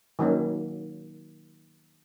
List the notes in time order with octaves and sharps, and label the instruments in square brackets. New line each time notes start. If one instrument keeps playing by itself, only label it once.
[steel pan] D#3 F#3 A#3 C#4